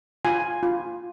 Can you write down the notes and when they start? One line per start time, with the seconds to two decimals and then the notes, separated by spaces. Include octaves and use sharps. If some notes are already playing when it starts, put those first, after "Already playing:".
0.25 F4 G#5
0.63 F4